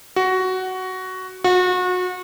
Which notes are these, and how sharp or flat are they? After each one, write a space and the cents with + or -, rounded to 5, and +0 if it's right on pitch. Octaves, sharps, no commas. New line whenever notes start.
F#4 +10
F#4 -30